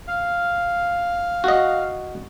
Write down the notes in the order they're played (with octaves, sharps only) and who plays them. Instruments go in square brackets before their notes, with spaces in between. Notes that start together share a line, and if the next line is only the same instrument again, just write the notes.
[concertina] F5
[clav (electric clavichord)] F#4 D#5